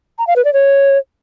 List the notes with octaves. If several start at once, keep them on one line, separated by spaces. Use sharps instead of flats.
A#5
F5
B4
D5
C#5